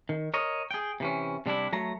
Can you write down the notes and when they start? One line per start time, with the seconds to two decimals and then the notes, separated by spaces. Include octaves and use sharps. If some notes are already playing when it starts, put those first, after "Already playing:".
0.09 D#3
0.34 A#4 C#5 D#5
0.71 G#4 G5
1.00 C3 E3 C#4
1.46 C3 G3 D4 E4
1.73 F#3 A3 A#5